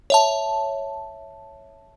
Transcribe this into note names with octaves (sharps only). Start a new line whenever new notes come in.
C#5 E5 A5